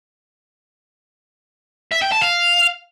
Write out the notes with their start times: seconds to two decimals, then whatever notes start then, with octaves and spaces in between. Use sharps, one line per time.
1.92 E5
2.02 G5
2.12 A5
2.22 F5